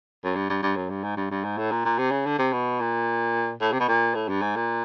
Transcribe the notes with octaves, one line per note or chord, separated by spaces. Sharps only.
F#2
G2
G2
G2
F#2
G2
G#2
G2
G2
G#2
A2
A#2
A#2
C3
C#3
D3
C3
B2
A#2
A2
C3
B2
A#2
A2
G2
G#2
A#2